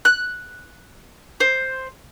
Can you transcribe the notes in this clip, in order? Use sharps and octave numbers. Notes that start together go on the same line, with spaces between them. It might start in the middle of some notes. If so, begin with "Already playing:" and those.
F#6
C5